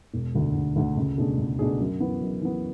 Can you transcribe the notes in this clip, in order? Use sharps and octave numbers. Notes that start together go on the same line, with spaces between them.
E1
D2 D3 A3
E1
D2 D3 A3
C#2
B2 A3 D4 G#4
C#2
B2 A3 D4 G#4
F#2
E3 B3
F#2
E3 B3